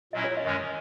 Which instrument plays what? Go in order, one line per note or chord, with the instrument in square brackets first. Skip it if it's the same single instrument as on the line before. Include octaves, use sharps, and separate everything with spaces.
[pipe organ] A#2 F#3 C#4 E4 [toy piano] D#5
[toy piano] C#5
D#5
[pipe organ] F#2 D#3 G#3 C#4